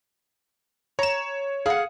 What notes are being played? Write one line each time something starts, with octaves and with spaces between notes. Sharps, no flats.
C#5 A#5 E7
G#4 F5 F#5